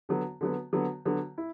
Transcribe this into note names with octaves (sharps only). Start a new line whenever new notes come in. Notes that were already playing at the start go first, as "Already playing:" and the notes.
D3 F#3 B3
D3 F#3 B3
D3 F#3 B3
D3 F#3 B3
E4